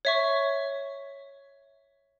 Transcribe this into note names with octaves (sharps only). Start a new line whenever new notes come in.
C#5 E5 C#6